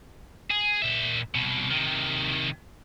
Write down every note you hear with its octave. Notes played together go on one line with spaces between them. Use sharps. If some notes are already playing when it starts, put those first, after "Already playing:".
G#4
A#2 E5
C2 B2
C3 D#3